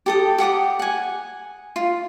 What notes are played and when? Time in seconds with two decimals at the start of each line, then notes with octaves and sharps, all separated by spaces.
0.06 G4 A4 D#6
0.38 G4 F#5 D6 D#6
0.79 F#5 G#5
1.76 F4